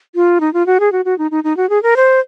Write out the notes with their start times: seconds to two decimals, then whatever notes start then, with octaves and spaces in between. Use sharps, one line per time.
0.15 F4
0.40 D#4
0.53 F4
0.66 F#4
0.80 G#4
0.92 F#4
1.05 F#4
1.18 D#4
1.31 D#4
1.44 D#4
1.57 F#4
1.69 G#4
1.83 A#4
1.96 C5